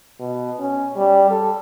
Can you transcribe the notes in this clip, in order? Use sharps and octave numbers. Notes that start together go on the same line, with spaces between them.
B2
C#4
G3
A4